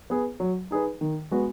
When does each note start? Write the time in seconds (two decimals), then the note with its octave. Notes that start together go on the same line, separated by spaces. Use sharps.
0.10 B3 G#4
0.40 F#3
0.71 D#4 G#4 B4
1.01 D#3
1.31 G#3 B3 F#4 B4